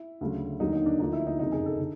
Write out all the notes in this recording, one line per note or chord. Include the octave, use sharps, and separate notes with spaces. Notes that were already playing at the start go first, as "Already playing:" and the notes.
Already playing: E4
D2 C#3 F#3
D#2 D3 F#3 A#3 D#4
D#4
D4
D2 D3 F3 A#3 D#4
E4
D#4
F#1 F2 C3 D#4
G#4
A4
D3